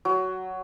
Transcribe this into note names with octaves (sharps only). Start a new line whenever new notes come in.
F#3